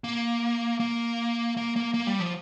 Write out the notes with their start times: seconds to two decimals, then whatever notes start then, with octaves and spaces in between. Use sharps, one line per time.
0.04 A#3
0.80 A#3
1.57 A#3
1.76 A#3
1.94 A#3
2.07 G3
2.20 F3